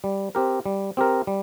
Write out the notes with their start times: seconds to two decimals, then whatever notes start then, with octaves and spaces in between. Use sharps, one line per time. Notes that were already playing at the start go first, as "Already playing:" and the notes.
0.04 G3
0.35 C4 G4 A#4
0.66 G3
0.97 C4 G4 A#4
1.27 G3